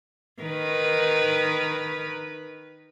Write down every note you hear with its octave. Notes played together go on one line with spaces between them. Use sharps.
D#3 A#4 B4